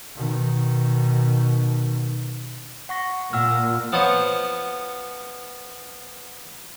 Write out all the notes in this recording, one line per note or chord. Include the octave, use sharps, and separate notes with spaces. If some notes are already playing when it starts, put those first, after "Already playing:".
B2 D#3
F#5 C#6 A#6
A#2 F#5 E6 F6
F3 B3 C5 C#5 D#5